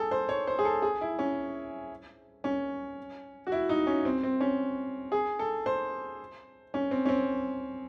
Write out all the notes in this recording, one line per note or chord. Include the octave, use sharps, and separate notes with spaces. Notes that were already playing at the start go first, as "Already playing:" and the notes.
Already playing: G#4 A4
C5
C#5
C5
G#4
A4
G#4
E4
C#4
C#4
F#4
E4
D#4
C#4
C4
C4
C#4
G#4
A4
C5
C#4
C4
C#4
C4